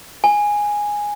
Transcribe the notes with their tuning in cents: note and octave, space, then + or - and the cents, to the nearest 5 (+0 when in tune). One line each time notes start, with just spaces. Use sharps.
G#5 -5